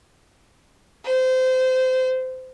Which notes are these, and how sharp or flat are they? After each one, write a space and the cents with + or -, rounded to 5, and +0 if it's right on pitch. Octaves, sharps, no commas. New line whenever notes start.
C5 -25